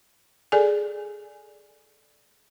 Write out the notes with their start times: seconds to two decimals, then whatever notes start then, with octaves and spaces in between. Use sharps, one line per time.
0.52 G#4 A4 D5 G#5